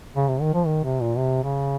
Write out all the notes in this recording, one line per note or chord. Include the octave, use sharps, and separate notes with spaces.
C#3
C3
D#3
F3
D#3
C3
A#2
C3
C#3